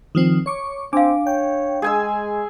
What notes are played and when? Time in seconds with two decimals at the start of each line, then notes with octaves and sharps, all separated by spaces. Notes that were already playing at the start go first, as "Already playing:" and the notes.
0.15 D#3 F3 C4
0.46 C#5 C#6 D6
0.93 C4 D4 F5 D6
1.27 C#5 G5
1.82 G#3 G#4 G#5 E6